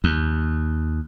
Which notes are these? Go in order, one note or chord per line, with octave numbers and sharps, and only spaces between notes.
D#2